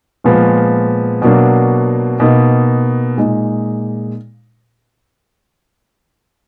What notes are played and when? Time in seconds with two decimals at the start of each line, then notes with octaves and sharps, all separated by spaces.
0.24 A#2 F3 G#3 B3
1.22 B2 F#3 A#3 D4
2.20 B2 A#3 D#4
3.18 A#2 G#3 D#4